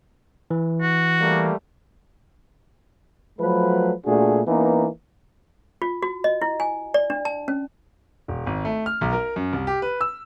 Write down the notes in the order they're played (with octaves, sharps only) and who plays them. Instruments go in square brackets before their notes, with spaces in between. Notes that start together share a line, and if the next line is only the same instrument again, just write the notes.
[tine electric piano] E3
[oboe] F#4
[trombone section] G3 A3 A#3
F3 F#3 A3 B4
A#2 A3 D4 F#4 G#4
E3 A#3 B3 C#4 D#4
[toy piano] F4
F#4
D#5
E4
G#5
D5
D4
A5
C#4
[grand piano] E1
G#1
A3
F6
B1
A#4
F#2
C2
G4
B4
E6